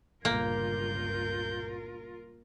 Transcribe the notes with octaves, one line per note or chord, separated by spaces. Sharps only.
G1 C#2 A#2 A#3 F4 A#4 G6